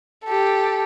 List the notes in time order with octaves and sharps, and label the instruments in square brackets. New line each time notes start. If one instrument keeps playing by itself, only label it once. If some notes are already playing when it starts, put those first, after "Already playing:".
[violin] G4 A4